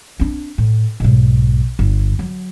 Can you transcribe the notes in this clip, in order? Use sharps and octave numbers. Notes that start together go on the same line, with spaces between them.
C4 D4
A2
B1 G#2
G1
F#3